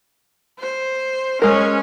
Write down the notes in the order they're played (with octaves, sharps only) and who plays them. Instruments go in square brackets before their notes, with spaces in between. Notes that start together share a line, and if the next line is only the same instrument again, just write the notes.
[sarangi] C5
[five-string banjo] G#3 A#4 [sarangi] C#4